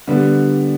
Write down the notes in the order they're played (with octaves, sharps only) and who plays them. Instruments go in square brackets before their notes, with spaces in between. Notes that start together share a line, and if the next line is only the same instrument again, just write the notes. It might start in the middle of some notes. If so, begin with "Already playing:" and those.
[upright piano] D3 G3 B3